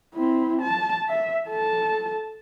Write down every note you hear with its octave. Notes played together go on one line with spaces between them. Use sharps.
C4 E4
A5
E5
A4 A5